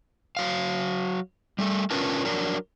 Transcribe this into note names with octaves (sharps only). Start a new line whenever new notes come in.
F#3 F5
G3 A3
C#4 D4 F4 A#4 B4 A5
F#3 D4 A#4